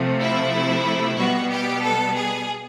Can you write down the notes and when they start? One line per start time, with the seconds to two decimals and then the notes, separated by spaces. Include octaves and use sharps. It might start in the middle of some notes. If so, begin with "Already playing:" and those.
Already playing: C3 F3 A3
0.20 E4
1.17 B2 G3 B3 F#4
1.50 G4
1.81 A4
2.14 G#4